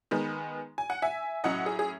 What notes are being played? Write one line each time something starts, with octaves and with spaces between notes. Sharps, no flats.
D#3 G#3 B3
G#5
F#5
E5 G#5
A2 F#3 C#4 D#5 F#5
G#4
G#4